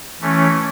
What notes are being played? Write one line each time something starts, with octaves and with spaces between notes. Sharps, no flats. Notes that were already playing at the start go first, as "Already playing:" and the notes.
E3 A3 C#4